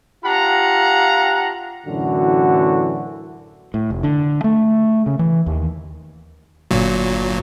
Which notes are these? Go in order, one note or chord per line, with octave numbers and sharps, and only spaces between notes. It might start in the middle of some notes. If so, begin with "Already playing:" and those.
D4 F4 G4 F5 F#5 A#5
F#2 A2 D3 E3 F#4
A2
F1
D3
A3
C#3
E3
D#2
G1 A#2 F#3